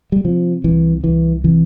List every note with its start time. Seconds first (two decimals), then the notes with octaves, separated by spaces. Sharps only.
0.12 G3
0.24 C3 F3
0.64 C2 E3
1.04 C2 E3
1.44 C3 E3